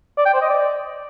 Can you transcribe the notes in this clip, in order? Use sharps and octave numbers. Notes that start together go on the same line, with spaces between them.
D5
G5
C5
D#5
D5